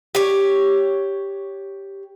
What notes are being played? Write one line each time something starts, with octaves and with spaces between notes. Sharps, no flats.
G4 C#5